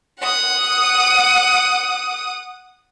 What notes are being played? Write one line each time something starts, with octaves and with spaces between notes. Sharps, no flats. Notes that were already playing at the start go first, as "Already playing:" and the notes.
F#5 D#6